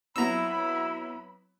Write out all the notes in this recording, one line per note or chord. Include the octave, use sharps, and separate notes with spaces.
F#3 B3 C4 E4 A#5 B5 E6